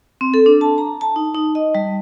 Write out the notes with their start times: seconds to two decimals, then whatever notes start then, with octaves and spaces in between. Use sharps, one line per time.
0.21 C4
0.34 A4
0.46 D4
0.61 A5
0.78 A#5
1.01 A5
1.16 D#4
1.35 D#4
1.55 D#5
1.75 G3